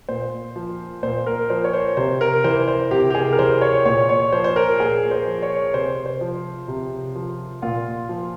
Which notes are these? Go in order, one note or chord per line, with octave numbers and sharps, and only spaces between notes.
A#2 C5
F3
A#2 C5
A#4
F3 C5
C#5
C5
C3 C5
A#4
E3 C5
C5
C3 G4
G4
G#4
A#4
E3 C5
C#5
A#2 C#5
C#5
F3 C5
C5
A#4
A#2 G#4
C5
F3
C#5
C3 C5
C5
F3
C3
F3
A#2 F4
F3